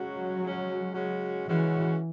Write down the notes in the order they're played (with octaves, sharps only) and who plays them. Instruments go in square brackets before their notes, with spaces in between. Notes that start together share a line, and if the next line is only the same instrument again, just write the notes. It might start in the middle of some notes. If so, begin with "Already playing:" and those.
Already playing: [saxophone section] C#3 G#3 C#4 F#4 [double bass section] F#3
[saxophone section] C#3 G#3 C#4 F#4
C#3 G#3 C#4 F#4
[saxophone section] C#3 G#3 C#4 F#4 [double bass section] E3